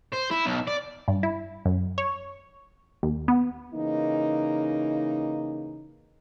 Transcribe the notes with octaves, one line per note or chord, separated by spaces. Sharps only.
C5
E4
B1
D5
G2
E4
F#2
C#5
D#2
B3
C#3 E3 A#3 D#4